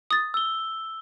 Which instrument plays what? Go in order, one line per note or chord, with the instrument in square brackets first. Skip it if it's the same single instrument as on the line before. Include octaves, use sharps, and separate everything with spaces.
[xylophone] D#6 A6
[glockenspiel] E6 G7